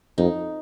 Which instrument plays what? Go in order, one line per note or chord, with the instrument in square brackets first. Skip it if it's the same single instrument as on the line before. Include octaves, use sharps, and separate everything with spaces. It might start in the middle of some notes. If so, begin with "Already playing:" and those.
[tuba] F2 [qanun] D#4